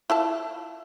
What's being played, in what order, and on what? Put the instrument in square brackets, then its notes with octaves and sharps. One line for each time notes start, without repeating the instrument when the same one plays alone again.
[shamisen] E4 F4 A5